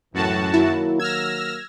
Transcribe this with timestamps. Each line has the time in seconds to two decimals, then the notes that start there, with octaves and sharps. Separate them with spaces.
0.14 C#2 F#2 A2 E3 F#4 A5
0.54 D#3 F#3 A#3 E4
1.00 E6 F6 G#6 A#6